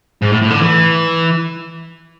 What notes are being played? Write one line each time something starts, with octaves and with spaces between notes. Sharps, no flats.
G#2
A2
A2
D3
E3